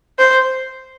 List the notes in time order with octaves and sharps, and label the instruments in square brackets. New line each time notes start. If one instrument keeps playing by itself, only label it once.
[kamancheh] C5